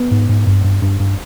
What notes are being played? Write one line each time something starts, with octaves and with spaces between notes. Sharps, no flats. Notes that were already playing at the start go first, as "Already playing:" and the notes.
Already playing: B3
G#2
G#2
G2
G2
G2
G2